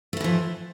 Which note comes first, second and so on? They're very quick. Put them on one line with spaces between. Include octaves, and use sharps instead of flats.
A3 E4 E3 F3